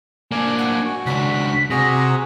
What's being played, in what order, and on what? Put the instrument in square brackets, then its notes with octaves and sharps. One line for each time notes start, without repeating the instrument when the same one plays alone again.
[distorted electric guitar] A#3 D4 [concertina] D5 G#5
[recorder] F#5
[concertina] F#4
[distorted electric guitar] C#2 D4 [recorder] B6
[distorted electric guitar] C3 [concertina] F#4 G#4 [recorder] A#6
[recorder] A#5